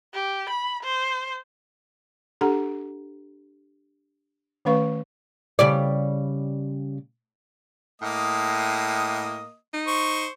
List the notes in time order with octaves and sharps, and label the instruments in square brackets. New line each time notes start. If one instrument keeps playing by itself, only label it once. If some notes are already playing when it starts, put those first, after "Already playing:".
[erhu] G4
B5
C5
[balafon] D4 G4 A4 F#5 A#5
D#3 A3 C#4 B4 F5 C#6
[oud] C#3 G3 D5
[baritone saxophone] A2 [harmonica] A#3 D#5 D#6
[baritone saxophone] D#4
[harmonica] C5 C#6